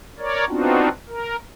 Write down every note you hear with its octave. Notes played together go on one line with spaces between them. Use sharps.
A#4 C#5 D5
B3 C4 D4 D#4 F4 F#4
A#4